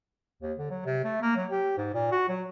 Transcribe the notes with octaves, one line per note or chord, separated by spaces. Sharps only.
D#2
D3
F#3
C3
A3
A#3
F#3
G4
G#2
A#2
F#4
F#3